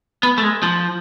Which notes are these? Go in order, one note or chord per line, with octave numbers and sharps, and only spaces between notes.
B3
A3
G#3
F3